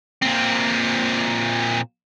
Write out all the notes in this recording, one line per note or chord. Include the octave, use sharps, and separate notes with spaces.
A#2 C4